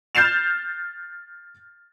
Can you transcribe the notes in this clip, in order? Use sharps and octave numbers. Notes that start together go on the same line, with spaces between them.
F6 G6 A6 C7 E7 F7